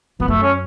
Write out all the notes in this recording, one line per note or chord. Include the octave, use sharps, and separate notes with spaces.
E2 B3
F#2 A3
C#4